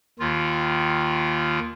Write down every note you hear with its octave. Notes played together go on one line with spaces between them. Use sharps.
D#2 D#3 F4